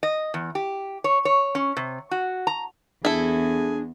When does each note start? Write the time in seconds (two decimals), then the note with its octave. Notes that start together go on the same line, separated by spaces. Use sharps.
0.03 D#5
0.34 E2
0.55 G4
1.04 C#5
1.25 C#5
1.55 C#4
1.77 C3
2.11 F#4
2.47 A#5
3.05 E2 D4 E4 G#4 A4